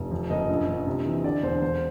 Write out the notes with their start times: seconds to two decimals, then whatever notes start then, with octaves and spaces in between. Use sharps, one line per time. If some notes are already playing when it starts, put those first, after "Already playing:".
Already playing: F1
0.11 F2
0.30 F#1 D#5
0.49 A#1
0.67 A#1
0.86 C3
1.05 E3
1.24 D3 D5
1.42 E1 C5
1.61 E1 C5